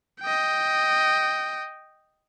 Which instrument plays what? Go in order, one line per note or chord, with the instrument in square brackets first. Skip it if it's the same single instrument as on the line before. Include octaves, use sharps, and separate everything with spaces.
[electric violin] D#5 G5